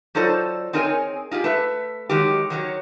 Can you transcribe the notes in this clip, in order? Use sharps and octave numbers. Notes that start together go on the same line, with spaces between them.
F#3 D#4 F4 A4 C5 D5
C4 D#4 G#4 A#4 C#5 G#5
D#4 F4 G4 G#4
A3 B4 E5
D#3 F#3 G#3 G4
D#3 F#3 C#5